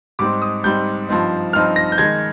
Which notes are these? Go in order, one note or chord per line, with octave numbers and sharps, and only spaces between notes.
G#2 G3 C4 D#4 D6
D#6
G#2 G3 C4 D#4 G6
G2 F3 C4 D#4
G2 F3 C4 D#4 F6
A#6
G6
D#3 G#3 D#4 G#6